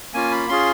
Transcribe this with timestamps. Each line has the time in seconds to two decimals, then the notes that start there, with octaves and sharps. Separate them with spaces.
0.14 A#3 C#4 F4 G#5
0.32 B5
0.49 C#4 F4 G#4 C6